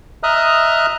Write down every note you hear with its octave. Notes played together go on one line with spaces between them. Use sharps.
D#5 E5 A#5 D#6 F6 F#6